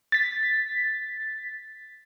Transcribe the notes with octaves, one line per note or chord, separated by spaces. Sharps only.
A6 B6